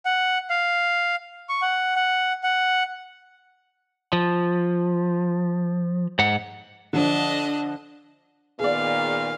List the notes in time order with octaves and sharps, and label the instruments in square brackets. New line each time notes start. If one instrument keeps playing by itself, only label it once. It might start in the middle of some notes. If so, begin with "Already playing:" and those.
[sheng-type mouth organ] F#5
F5
C#6
F#5
F#5
F#5
[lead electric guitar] F3
G#2 F#5
[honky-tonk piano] D3 F3 [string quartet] D4 D#5
[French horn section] A#2 D#3 B3 [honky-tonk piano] G#4 D5 [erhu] F5